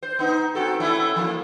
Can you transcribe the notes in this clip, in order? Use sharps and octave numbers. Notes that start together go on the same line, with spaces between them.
C5
B3 D#4
C4 F#4 A4
A3 C#4 E4
F3 A#3